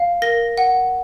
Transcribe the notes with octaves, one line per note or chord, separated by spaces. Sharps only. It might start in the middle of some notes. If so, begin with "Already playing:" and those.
Already playing: F5
A#4 A#6
F#5